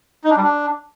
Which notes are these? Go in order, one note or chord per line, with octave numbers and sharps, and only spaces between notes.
D#4
D4
G3
D4